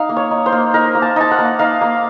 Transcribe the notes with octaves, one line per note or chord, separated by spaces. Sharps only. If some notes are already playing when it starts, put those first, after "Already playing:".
Already playing: D#4 F5
A#3
C#5
D#4
C5
A#3
D#4 A#4
A#3
A5
D#4 A5
F#5
A#3
D#4 F5
A#3